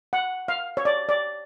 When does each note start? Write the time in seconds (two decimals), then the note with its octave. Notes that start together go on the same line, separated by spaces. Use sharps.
0.13 F#5
0.48 F5
0.77 C#5
0.85 D5
1.09 D5